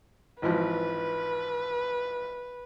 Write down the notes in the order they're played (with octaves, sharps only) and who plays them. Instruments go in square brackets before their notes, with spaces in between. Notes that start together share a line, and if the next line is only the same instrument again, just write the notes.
[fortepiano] G#1 E3 F3 [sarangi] B4